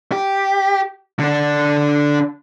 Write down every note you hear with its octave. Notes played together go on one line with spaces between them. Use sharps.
G4
D3 D4